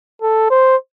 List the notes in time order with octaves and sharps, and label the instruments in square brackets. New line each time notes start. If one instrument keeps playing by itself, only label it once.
[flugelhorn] A4
C5